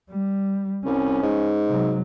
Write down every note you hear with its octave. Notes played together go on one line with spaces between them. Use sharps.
G3
C2 C#4
G#2
C3 F#3